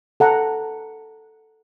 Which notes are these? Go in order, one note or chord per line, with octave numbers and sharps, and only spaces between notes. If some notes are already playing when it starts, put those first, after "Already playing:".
A4 F#5 A#5